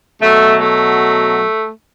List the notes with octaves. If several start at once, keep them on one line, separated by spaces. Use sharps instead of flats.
B2 F#3 A3
A3